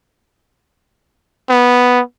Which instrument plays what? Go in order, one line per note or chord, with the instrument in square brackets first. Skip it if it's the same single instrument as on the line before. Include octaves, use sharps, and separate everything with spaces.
[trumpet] B3